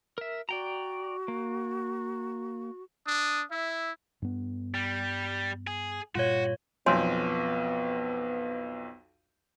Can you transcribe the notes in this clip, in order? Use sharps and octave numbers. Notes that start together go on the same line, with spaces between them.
A#4 E5
F#4 D5 G5 A#5
A#3
D4 D#6
E4 E5
G2 B3
G3
G#4
G2 A#2 F4 F#4 C#5
B1 F2 B3 C#5 G#5 C6